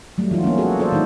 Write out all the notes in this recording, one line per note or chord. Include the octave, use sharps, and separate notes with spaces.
F#3 G3 A3
E3 D#4 F4 F#4
G3 A#3 B3 C#4
A#3 F#4 G#4 A4
F4 A4 C5 D5
D#3 G#3 C#4 D#4 E4